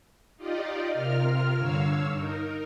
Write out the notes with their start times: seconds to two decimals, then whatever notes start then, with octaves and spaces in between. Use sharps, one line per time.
0.37 D#4 F4 G4 D5 D#5
0.90 C3 F4 A#4 F6
1.56 G2 D3 C#5 F5 E6
2.10 D#4 A#4